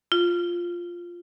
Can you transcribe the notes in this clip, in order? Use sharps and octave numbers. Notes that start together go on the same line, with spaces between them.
F4